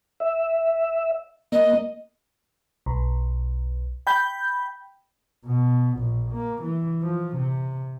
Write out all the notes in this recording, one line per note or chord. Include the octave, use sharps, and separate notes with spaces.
E5
A#3 D#5
B1
G5 B5 G6
B2
A#1
A#3
E3
F3
C3